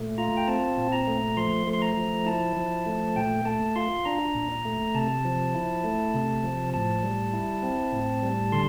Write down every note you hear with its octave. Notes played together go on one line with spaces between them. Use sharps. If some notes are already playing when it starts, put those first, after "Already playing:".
Already playing: A#2 A3
F4 A#5
G5
C4 A5
A#2
A#5
A3
F3 C6
A3
C6
A#5
F3
E4 A5
F3
A3
A#2 G5
A3 A5
F4 C6
D4 A#5
A#2
A3
C3 A5
F3
E4
A3
C3
F3
A2 A5
G3
E4
C4
A2
G3
D3 C6